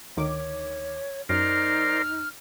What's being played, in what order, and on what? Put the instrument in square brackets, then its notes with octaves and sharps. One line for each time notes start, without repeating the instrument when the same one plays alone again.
[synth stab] D2 D#3 D6 [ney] C#5
[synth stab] F#2 [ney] D#4 [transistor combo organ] A#4 C5 D5 [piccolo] F6